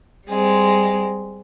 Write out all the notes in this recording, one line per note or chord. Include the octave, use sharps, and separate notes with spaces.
G3 G#3 C4